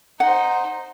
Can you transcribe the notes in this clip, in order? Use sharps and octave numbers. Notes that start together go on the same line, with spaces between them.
D#4 C5 F#5